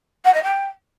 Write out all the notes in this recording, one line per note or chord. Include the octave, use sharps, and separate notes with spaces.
F#5
D#5
G5